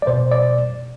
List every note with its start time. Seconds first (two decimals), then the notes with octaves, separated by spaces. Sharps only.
0.02 D5
0.07 B2 C5
0.31 D5